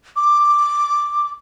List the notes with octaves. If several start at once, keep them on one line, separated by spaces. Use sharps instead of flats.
D6